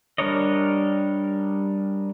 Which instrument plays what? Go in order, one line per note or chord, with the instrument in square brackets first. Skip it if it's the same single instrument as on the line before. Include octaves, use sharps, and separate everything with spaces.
[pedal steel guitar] G3 D4 A#4 C#5 D#5